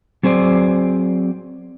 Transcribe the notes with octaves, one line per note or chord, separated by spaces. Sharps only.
F#3 C4 G#4 C5 D5